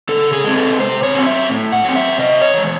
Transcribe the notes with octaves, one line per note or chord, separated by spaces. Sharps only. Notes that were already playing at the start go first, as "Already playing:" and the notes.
C#3 A4
G#4
G#3 C4
A4
C3 C5
C#5
F#3 C4
E5
A2
F#5
F#3 C4
E5
C3 D#5
C#5
E3 G#3